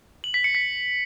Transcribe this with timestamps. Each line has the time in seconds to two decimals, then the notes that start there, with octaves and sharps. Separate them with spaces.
0.24 F#7
0.34 B6
0.44 C#7
0.55 B6